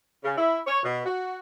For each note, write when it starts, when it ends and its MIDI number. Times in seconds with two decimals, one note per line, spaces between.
0.24 0.35 49
0.38 0.58 64
0.67 0.81 73
0.83 1.03 47
1.05 1.39 66